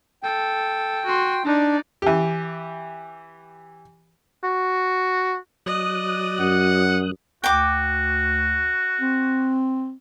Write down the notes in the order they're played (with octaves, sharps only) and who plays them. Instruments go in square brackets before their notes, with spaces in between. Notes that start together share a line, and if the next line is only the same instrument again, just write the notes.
[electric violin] A4 [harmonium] G5
[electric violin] F#4 C6
[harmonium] D4 [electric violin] D#4 D5
[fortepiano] E3 G4
[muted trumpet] F#4
[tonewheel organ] F#3 D#6 F#6 [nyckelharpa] D5 D#5
[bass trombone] F#2 [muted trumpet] F#5
[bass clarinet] D2 [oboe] F#4 [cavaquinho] G5 D6
[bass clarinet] C4